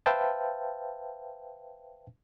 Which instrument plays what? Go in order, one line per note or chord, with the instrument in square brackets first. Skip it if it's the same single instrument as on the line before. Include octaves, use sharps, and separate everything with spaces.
[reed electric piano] B4 C5 E5 F5 G5 A5